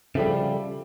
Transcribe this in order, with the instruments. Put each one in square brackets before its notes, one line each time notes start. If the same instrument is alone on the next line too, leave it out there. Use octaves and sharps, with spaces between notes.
[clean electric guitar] C#3 F3 G3 [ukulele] G#4 A4 E5